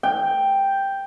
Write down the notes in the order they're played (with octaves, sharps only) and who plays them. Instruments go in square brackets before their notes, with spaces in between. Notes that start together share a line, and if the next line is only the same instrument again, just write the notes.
[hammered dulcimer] G5